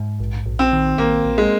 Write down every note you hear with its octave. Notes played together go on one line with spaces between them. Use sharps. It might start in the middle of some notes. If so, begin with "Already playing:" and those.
Already playing: G#2
A#1
A#1
C4
D#3
A#1 A#3
A#1
G#3